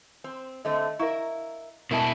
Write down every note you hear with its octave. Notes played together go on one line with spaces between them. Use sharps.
C4
D3 A3 C4 D#5
E4 A#4 F5 A#5 C#6
G2 B2 E4 A#4 G#5 A5